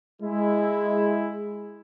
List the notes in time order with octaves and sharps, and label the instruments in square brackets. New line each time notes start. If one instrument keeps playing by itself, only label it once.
[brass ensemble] G#3 E4